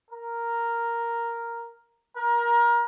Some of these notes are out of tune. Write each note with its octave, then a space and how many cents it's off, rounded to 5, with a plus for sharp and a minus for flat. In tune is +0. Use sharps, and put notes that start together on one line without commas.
A#4 +0
A#4 +25